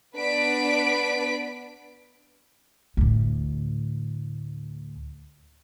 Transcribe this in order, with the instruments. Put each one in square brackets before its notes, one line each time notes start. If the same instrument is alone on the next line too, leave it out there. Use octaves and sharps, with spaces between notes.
[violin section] B3 D4 B4 B6 D7
[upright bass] D2 A2